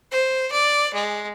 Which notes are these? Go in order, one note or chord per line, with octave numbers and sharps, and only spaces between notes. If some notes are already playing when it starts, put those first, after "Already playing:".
C5
D5
G#3